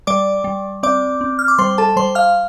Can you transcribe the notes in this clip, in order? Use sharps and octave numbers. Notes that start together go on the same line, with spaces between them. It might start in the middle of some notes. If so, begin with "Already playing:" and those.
G3 D5 D6
G3
C4 D5 D6
C4
F6
D6
G3 C5 C6
A4 A5
G3 C5 C6
F5 F6